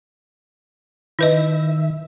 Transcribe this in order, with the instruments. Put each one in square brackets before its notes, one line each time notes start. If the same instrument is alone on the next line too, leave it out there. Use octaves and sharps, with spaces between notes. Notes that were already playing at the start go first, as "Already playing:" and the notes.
[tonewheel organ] D#3 E5 [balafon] E4 B4 D#5